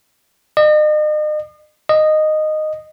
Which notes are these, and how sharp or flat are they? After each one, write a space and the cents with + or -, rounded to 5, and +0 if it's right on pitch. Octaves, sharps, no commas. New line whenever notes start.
D#5 -40
D#5 -10